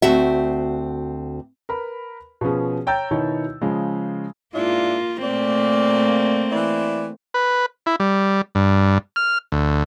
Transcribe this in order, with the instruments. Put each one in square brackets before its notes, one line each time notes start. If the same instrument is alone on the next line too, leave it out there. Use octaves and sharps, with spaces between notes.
[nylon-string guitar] D2 C4 F#4 E5
[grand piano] A#4 B4 B5
B2 F3 B3 C#4 G#4
C#5 G5 A#5 E6 G6 A6
B2 D#3 D#4 E4 C#5
C#3 F3 G#3
[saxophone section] G#2 D4 E4 [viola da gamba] A#3 F4
[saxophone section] A#2 D5 [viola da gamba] A3 A#3 C4
[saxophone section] E3 E4 D5
[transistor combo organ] B4
E4
G3
G2
F6
D2